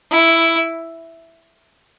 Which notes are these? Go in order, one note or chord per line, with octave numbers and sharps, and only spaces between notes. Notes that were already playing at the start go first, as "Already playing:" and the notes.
E4